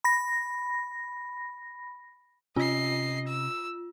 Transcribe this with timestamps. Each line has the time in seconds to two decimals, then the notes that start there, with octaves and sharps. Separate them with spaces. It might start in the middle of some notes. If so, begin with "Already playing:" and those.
0.04 B5 A#6
2.56 C3 C#4 F4 D#5 C7
3.27 E6